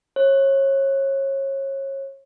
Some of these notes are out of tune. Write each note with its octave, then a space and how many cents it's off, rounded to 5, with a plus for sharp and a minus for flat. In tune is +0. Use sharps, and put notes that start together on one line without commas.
C#5 -30